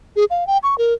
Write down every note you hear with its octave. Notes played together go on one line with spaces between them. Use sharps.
G#4
F5
G5
C#6
A#4